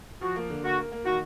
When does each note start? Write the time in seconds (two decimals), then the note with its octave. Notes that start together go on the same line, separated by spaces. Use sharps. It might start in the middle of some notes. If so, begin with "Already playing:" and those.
0.21 F3 F#4
0.36 A#3
0.50 D3
0.63 A#3 F#4
0.78 A#3
0.92 A#3
1.05 D#3 F#4